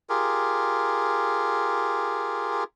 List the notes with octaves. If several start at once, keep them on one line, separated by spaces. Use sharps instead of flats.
F4 G4 G#4 A#4